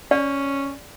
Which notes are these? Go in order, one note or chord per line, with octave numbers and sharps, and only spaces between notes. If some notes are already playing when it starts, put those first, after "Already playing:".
C#4 D5